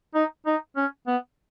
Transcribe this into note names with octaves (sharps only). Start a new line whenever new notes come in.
D#4
D#4
C#4
B3